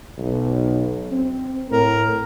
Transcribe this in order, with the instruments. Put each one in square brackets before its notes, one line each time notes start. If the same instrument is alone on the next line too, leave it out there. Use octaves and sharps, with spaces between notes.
[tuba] B1
C4
[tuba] A2 [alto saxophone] A#4